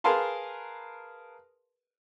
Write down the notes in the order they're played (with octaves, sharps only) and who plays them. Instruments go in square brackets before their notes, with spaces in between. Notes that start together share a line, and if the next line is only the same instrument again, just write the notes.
[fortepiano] G#4 A#4 B4 F5 A5 C6